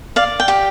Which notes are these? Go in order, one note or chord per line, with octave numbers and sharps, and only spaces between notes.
D5 F5
G5
G4